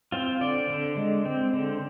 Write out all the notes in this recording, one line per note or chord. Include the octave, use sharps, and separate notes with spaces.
C4 F4
D3 D5
D3
G#3
C4
D3